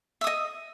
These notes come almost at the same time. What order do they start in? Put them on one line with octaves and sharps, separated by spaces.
E5 D#6 D#5